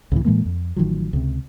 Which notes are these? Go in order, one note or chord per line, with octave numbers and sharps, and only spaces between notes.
C#2 A2 C3 E3
A2 E3 G#3 A#3
F2
A1 D#3 F3 F#3
C#2 C3